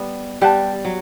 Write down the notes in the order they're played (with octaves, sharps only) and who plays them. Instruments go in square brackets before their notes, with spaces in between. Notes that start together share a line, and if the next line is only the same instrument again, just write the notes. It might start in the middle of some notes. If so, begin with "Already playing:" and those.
Already playing: [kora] G3 B3
[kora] G3 [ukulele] G4 B4 F#5 A5
[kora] F#3